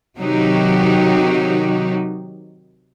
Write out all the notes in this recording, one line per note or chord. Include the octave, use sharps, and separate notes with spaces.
C3 D#3 F#3 D#4 F#4 G4